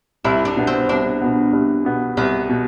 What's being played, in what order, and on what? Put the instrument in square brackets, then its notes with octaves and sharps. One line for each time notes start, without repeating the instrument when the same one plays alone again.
[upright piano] C2 [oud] E4
[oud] D4
[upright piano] B2 B3
[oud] C4
[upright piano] C2 [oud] D4
[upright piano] B2 B3
C2
B2 B3
[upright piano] C2 [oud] B3
[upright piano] B2